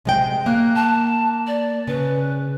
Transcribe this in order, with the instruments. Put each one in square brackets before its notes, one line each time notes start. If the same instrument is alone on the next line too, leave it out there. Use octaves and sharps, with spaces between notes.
[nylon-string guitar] C3 G#3 G5
[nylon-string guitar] A#3 [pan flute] F#6
[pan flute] A5
D5
[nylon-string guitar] C#3 [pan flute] B4